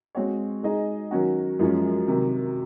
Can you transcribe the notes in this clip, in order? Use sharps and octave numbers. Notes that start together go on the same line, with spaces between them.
G#3 C4 F#4 C#5
G#3 D#4 G#4 D#5
D#3 F#3 C#4 F#4
F#2 F3 G#3 C#4
C3 D#3 F#3